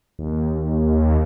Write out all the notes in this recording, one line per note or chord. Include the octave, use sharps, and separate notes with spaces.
D#2